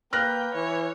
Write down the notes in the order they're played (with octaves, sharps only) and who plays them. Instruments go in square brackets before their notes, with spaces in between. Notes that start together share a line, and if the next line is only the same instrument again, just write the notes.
[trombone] A#3 [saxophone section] B4 [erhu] G5 [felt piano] F6 F#6 A#6
[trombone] E3 [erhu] C#5